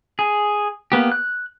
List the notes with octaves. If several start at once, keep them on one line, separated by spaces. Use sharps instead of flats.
G#4
A#3 B3 G4
F#6